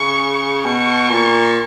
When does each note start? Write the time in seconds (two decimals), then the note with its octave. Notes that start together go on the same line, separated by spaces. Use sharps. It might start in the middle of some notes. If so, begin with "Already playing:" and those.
Already playing: C#3 C#6
0.64 B2 C#6
1.10 A#2